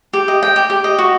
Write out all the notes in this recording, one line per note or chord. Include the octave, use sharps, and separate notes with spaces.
G4
D#5
G5
G4
G4
D#5
F#4